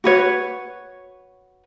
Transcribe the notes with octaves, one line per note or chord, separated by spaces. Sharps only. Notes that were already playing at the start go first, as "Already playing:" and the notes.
F#4 B4 C#5